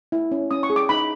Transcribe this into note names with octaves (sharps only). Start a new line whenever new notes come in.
E4
C#4
C#4 D#6
C#6
G#4
D6
D#4 B5